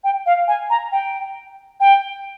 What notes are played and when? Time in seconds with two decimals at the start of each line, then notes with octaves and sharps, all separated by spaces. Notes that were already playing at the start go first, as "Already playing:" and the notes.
0.04 G5
0.26 F5
0.48 G#5
0.70 A#5
0.92 G5
1.80 G5